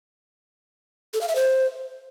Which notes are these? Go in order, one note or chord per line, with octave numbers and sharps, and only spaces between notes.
A4
F5
E5
C5